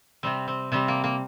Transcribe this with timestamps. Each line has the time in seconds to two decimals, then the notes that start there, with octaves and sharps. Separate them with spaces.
0.23 C3 G3 C4
0.48 C4
0.72 C3 G3 C4
0.88 A#3
1.04 A#3